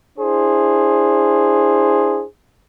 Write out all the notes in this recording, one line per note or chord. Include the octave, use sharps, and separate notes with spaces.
D4 E4 G#4 C5